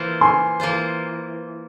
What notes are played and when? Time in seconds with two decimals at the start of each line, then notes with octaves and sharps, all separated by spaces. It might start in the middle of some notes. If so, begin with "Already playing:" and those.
Already playing: E3 A#3 F4 C5
0.21 G#5 C6
0.60 E3 A#3 F4 C5